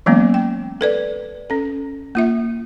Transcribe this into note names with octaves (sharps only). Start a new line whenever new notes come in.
E3 F#3 G#3 A#3 B3 C#4
G5
A4 B4 D5
C#4 A4
A#3 F4 E5